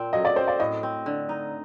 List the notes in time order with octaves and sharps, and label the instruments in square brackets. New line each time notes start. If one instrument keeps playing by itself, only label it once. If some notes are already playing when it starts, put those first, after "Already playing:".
Already playing: [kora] A#2 A#3 C4
[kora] F#3 [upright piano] D#5
[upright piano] D5
[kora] C4 [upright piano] C5
[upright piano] D5
[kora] A2 [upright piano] D#5
[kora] C4
D3
D#4